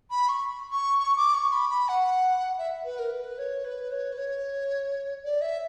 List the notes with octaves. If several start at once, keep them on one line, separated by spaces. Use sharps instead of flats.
B5
C#6
C#6
C#6
D6
C#6
B5
B5
F#5
E5
B4
A#4
B4
C#5
B4
C#5
B4
C#5
D5
E5